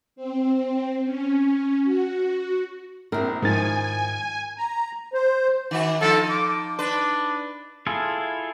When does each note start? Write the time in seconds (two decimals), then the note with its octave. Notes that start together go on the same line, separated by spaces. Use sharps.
0.16 C4
1.05 C#4
1.84 F#4
3.12 A#1 C4 E4 A#4
3.42 G#2 D#3 F3 G#5 A6
4.58 A#5
5.13 C5
5.71 D#3 F#4
6.01 F3 D#4 A4
6.30 D6
6.79 D4 B4
7.87 E4 F4 G#4 A4